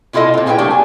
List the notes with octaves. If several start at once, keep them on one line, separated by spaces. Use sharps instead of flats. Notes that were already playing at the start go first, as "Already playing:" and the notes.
C3 E4 F4 A4 D#5
A#2 C4
E4 G#4 B4 D5 G5
F#3 A3 A#3 D4 G4
G#5